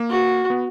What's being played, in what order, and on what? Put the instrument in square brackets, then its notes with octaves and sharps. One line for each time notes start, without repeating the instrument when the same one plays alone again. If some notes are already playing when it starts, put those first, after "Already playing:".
Already playing: [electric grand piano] A#3
[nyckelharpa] F#4
[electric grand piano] B3